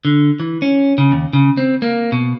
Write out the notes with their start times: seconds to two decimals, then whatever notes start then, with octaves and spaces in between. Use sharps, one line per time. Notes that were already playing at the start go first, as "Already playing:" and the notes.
0.05 D3
0.40 E3
0.62 C#4
0.98 C#3
1.12 D#2
1.33 C#3
1.57 C4
1.82 A#3
2.12 B2